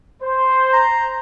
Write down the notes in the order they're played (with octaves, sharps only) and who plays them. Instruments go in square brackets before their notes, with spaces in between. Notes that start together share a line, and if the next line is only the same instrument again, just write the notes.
[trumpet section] C5
[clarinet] A#5